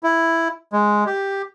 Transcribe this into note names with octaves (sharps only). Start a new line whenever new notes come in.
E4
G#3
G4